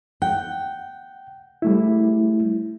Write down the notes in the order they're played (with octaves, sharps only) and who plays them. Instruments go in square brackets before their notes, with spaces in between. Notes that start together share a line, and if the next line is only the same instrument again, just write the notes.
[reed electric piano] F#5 [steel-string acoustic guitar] G5
[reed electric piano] G3 A3 E4